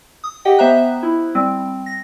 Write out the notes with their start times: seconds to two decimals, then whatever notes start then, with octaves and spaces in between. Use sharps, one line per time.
0.24 D#6
0.45 G4 D#5 F#5 G5
0.58 B3 C5 E5 A#5 F#6
1.03 E4
1.35 G3 C4
1.86 A#6